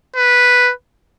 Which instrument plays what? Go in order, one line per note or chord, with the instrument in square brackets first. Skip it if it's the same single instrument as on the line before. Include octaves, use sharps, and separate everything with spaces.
[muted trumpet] B4